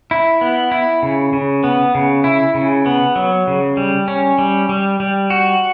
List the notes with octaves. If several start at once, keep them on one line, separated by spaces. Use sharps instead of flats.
E4
B3
E4
C#3
C#3
B3
C#3
E4
C#3
B3
F#3
C#3
G3
C#4
G3
G3
G3
F#4